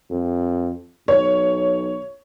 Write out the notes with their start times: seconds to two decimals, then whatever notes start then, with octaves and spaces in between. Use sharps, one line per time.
0.10 F2
1.08 B1 C#5